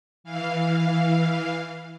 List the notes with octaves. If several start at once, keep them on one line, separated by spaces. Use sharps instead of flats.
E3 F5